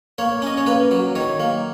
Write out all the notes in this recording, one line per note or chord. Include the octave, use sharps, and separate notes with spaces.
A#3 C#5
C#4 D#5
C#5
A#3 B4
F#3
D#3 C#5
A#3